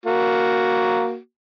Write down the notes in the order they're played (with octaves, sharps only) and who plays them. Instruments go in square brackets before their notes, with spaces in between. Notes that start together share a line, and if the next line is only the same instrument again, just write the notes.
[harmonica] A#3 F#4